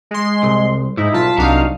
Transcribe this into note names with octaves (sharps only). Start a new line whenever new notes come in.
G#3 C6
C2
G#2 D#4 E4
B1 F4 A5 B6
C2 F#3 D4 D#4 F5